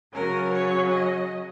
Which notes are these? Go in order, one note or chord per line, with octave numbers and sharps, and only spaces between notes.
C#3 F#3 C#4 A#4
C#5
D#5